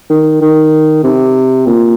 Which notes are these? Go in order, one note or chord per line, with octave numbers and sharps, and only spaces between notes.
D#3
D#3
C3
A#2